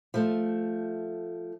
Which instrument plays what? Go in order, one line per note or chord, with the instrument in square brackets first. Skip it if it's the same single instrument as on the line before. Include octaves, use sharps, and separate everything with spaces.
[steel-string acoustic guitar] F3 A3